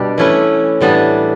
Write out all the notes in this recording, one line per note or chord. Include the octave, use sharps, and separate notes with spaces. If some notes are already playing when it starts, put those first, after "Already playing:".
Already playing: B2 G3 D4 G4
E3 A3 C#4 E4 B4
A2 E3 G3 B3 D4